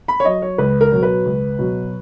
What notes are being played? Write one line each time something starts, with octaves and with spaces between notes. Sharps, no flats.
B5
C#5
F#3 D#5
C#5
C#2 B4
A#4
B2 F#3
B4
C#2
B2 F#3